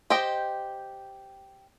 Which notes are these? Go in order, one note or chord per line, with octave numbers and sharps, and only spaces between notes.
G4 C5 D#5 G5